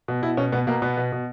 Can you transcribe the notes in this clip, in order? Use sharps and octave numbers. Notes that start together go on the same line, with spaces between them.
B2
B2 E4
B2 C#4
B2 B3
B2 A#3
B2 B3
B2
B2